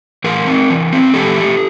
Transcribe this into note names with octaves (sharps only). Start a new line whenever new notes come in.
E3 G#4 A#4
C4
E3
C4
E3 G4 A4
A3